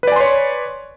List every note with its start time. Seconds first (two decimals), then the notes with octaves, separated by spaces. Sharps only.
0.03 B4
0.07 D5
0.12 G#5
0.16 C6
0.20 C#5